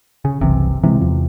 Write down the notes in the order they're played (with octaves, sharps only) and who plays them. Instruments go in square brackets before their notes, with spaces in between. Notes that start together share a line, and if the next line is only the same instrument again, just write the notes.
[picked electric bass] C#3
[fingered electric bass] F#1 C2 E3 [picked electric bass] C3
[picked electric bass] C3 [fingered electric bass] E3 G#3
[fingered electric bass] E2 F3